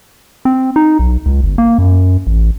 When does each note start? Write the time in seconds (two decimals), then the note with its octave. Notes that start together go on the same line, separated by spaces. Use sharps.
0.45 C4
0.76 D#4
0.99 B1
1.26 C#2
1.44 G1
1.58 A#3
1.78 F#2
2.27 A1